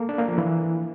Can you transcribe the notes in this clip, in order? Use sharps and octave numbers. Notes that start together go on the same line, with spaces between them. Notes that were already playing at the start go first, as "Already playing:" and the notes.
Already playing: A#3 A4
D4
A#3
F3
E3